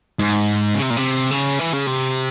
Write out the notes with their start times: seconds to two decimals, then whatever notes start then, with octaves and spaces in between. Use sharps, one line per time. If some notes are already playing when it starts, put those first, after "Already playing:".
0.19 G#2
0.75 C#3
0.82 C3
0.90 A#2
0.97 C3
1.31 C#3
1.59 E3
1.73 C#3
1.87 C3